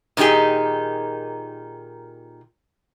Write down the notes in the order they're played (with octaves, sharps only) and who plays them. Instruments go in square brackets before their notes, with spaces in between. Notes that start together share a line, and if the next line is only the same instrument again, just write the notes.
[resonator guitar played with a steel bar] A#2 D#3 D#4 G4 G#4